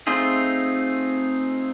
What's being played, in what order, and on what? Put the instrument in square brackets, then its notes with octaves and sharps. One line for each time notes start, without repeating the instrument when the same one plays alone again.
[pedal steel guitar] A3 C4 D#4 F4 G#4